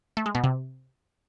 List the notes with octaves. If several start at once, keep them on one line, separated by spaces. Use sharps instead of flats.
A3
G#3
B2
C3